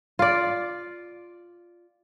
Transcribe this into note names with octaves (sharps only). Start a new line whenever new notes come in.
F4 D5